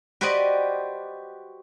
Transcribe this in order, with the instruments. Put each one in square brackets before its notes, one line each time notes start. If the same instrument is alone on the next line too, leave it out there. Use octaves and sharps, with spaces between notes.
[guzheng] F#4 G4 B4 C5 D5 D#5